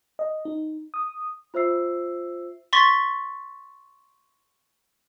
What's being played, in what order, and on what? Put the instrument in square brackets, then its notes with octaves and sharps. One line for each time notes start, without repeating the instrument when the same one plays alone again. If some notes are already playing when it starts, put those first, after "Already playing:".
[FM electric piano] D#5
D#4
D#6
[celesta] F4 C5 E5 E6 C7
[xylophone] C6 C#6 A6 B6